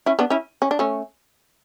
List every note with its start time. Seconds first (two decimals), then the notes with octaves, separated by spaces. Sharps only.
0.06 C#4 E4
0.19 B3 D4
0.30 C#4 E4
0.62 C#4
0.71 D4
0.79 A3 C#4